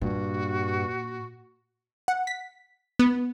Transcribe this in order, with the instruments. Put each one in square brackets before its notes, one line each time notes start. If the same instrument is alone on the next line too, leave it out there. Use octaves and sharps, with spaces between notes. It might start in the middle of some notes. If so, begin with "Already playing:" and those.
[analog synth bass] G2 [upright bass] A#2 [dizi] F#4
[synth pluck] F#5
B6
B3